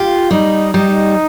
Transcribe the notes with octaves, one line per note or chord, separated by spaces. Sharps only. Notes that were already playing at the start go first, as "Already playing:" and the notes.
Already playing: F4 G4
G3 D#4
G3 D#4